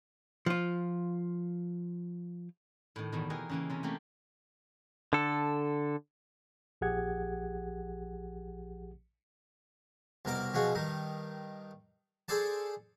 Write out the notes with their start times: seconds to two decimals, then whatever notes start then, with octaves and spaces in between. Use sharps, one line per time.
0.46 F3 F4
2.96 A2 D#3
3.12 E2 B2 D#3
3.30 E3 D#4 G4 G#4 A#4
3.49 C#3 E3 A#3
3.70 C3 C#4 A#4
3.83 A3 A#3 C4 G4
5.13 D3 A4
6.81 A#1 F3 G4 G#4 F#5 G#6
10.25 C2 B2 A#4 D6
10.54 B2 F3 F#4 G#4
10.75 G2 D#3 D#4
12.28 G#4 A4 C5 D5 A5